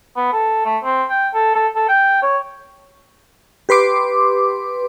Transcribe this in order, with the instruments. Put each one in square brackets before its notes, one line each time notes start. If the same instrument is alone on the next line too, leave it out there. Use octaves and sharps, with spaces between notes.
[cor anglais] B3
A4
A3
C4
G5
A4
A4
A4
G5
C#5
[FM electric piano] G4 B4 C6 D6